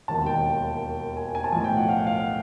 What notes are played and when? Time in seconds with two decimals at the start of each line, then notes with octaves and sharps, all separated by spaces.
0.08 E1 D#2 D#3 A5
0.26 G5
1.17 G#5
1.35 G#5
1.44 A5
1.52 B1 A2 F3 G#5
1.64 G5
1.77 F#5
1.89 F5
1.98 F#5
2.07 F5